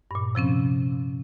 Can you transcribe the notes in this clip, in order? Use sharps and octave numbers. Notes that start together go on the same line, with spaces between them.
G2 A#2
C3 F3 C4 C#4